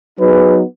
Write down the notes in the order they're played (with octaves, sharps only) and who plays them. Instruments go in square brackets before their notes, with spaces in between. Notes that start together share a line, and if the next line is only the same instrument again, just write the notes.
[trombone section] F#3 B3 D#4 G#4 B4